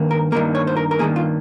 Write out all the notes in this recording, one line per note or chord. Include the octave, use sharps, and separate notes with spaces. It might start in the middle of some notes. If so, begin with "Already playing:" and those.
Already playing: G2 D#3 A#3
A#4
G2 D#3 A#3 A#4
C#5
C5
A#4
A#4
G2 D#3 A#3 G#4
F4